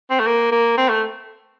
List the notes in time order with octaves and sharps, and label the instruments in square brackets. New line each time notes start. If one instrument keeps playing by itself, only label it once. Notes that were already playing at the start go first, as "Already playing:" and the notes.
[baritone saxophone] C4
A3
A#3
A#3
C4
A3